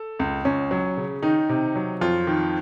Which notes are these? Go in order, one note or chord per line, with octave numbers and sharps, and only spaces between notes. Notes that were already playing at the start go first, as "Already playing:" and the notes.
Already playing: A4
C#2
C#2 C#4
F#3
C#3
D#3 D#4
C3
F#3
F2 F4
D#3